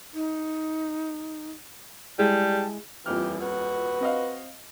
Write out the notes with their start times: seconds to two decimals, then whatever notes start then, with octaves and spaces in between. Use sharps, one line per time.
0.14 D#4
2.19 G3 G#3 E4 G#4 A5
3.06 D#1 F2 E3 G4 F6
3.41 F#4 B4
4.01 C4 D#5 F5